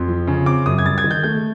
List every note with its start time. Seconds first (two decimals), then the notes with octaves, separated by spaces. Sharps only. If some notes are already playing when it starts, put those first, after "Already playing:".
Already playing: F2 C6
0.08 F3
0.27 C#3
0.46 C4 D6
0.66 F#2 D#6
0.78 G#6
0.85 G3 A6
0.98 G#6
1.04 D#3
1.11 G6
1.23 A3 G6